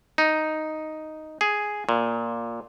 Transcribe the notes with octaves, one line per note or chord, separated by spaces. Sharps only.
D#4
G#4
A#2